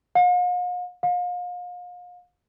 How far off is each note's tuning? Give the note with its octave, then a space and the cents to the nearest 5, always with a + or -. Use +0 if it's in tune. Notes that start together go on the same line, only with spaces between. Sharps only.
F5 +45
F5 +35